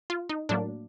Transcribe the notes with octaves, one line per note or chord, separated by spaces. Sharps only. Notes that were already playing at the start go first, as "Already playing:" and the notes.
F4
D#4
A2 F#3 A#3 D4